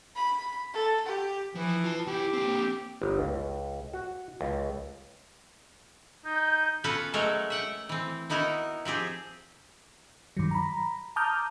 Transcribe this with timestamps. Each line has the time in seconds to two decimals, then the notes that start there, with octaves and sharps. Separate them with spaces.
0.16 B5
0.74 A4
1.07 G4
1.55 E3 F3
1.84 F4 A5
2.07 E2 E4 G4
2.33 A#3 C4
3.02 G1
3.19 C#2
3.94 F#4
4.41 C#2
6.25 D#4 G6
6.84 B3 C#4 F4 F#4 A4 B4
7.14 F#3 G#3 A3 A4 A#4 C#5
7.50 E5 F#5 G5
7.89 E3 C4
8.30 B3 D#4 E4 F#4 A#4
8.85 F3 C4 G4 G#4
10.37 G2 D#3 F#3
10.51 A#5 B5
11.16 A5 A#5 D6 D#6 F6 G6